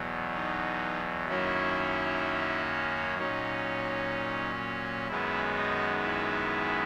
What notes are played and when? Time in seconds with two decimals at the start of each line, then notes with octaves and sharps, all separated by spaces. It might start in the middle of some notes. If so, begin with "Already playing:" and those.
Already playing: E2 B2 F#3
0.34 D#4
1.28 F#2 D#3 F#3 A#3 C#4 E4
3.18 A#2 F#3 C#4 D#4
5.08 F#2 D#3 G#3 B3 E4
5.56 D#4
6.03 E4